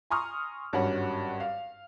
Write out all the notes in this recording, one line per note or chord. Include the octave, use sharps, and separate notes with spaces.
G#5 A#5 C6 C#6 D#6 F6
G#1 G2 F#3 C#4 F#4 F#5
F5